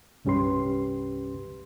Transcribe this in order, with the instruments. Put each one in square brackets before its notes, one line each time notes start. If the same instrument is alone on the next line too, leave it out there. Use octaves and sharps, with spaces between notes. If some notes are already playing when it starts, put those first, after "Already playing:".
[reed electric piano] C2 G2 C#4 G4 B4 C6